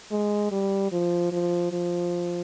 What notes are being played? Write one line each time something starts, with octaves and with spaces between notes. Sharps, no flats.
G#3
G3
F3
F3
F3